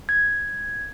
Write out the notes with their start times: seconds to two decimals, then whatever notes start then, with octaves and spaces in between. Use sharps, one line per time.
0.09 G#6